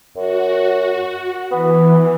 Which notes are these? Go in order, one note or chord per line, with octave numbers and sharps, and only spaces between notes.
F#2 F#4
E3 B3